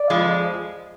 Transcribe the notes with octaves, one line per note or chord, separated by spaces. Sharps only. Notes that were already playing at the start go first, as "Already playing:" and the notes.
Already playing: D5
F2 F3 G#3